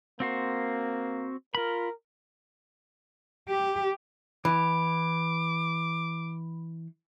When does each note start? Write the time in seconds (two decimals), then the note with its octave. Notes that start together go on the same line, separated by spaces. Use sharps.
0.20 A#3 C4 F#4 C5
1.55 F4 A#4 B5
3.48 G4
4.45 E3 B5 D6